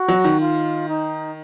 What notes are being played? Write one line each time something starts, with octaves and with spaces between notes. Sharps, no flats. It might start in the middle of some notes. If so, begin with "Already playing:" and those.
Already playing: F#4
F#3
D#3
F4
D#4